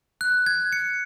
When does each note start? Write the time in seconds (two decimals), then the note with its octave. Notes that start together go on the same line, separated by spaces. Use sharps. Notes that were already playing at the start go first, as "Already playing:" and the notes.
0.21 F#6
0.46 G#6
0.72 C#7